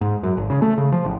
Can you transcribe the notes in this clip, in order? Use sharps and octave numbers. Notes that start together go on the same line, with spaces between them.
G#2
F#2
G#1
C#3
A3
C#3
F3
A1